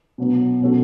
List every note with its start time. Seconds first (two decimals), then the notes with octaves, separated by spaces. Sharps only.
0.18 B2 F#3 B3
0.61 B2 F#3 C#4 F#4 A4